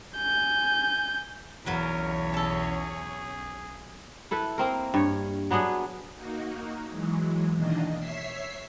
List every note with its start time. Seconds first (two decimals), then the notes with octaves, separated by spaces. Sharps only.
0.17 G#5 G6
1.66 B1 E2 F#3 B3 C#4 A#4 C#5 F5
2.34 G#4 A4 A5
4.31 E4 A4 B4
4.58 A#3 C4 A#4
4.94 G2 C#5
5.51 F#3 B3 D4 G#4
6.15 A#3 D#4 F#4
6.89 E3 F#3 G#3
7.53 E2 B2 D#3 A#3 D4 D#5
7.97 C#5 E5 E6 B6 C7